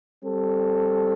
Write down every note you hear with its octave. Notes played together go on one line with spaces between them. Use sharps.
G3 C4 A4